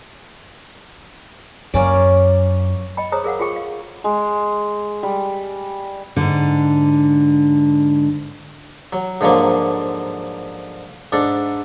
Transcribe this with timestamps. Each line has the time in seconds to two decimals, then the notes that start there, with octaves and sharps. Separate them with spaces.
1.74 F#2 A#3 C#4 D5
2.97 D#5 G5 B5
3.12 G#4 C5 C#5 A#5 D#6
3.24 G#4 A#4 F5 F#5
3.40 F4 G#4 A4 G5 C#6
3.56 F5
4.04 G#3
5.03 G3
6.16 G#2 D3
8.93 F#3
9.21 G#2 D3 F3 F#3 A#3
11.12 G#2 D4 A4